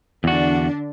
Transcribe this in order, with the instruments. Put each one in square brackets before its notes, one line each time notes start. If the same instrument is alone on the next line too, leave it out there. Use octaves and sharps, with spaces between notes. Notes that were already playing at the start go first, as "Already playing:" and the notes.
[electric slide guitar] E2 F#4 [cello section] D3 D4